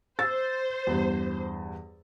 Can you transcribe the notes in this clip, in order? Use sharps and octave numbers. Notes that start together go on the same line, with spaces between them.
C5 E6 A6
E2 G2